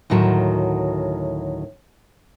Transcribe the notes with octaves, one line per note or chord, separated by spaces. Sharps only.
D2 A2 D#3 F#3 A5